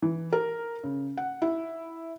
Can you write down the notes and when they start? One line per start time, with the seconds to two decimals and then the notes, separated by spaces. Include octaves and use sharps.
0.02 E3
0.33 A#4
0.84 C#3
1.17 F#5
1.42 E4